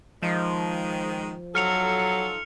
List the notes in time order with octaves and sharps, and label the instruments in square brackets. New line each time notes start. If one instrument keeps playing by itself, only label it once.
[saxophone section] D#3 G#3 [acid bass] F3
[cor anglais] F#3 [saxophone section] D#4 F4 A4 [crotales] F6 C#7 F7